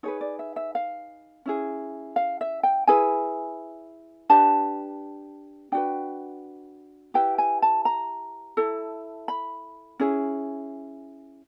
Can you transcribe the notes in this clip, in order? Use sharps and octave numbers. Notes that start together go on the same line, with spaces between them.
D#4 G#4 B4 C#5
D5
E5
E5
F5
C#4 E4 G#4
F5
E5
G5
E4 G#4 B4 G#5
D4 G4 B4 A5
D4 F#4 B4 G5
E4 G4 B4 G5
G#5
A5
A#5
E4 A4
B5
C#4 E4 G#4